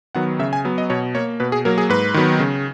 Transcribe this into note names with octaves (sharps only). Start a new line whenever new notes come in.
D#3 F#3 B3 F#5
C#3 E5
G#5
F#3 B3
D#5
B2 C#5
A#3 C#5
B2 B4
G#4
F#3 A#3 A#4
G#4
G#2 B4
D#3 F#3 B3
C#3